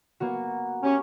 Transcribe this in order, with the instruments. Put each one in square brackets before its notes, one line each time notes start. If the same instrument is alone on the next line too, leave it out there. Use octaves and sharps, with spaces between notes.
[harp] A#3 B3 F#4
[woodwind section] C#4 [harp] G4 C#6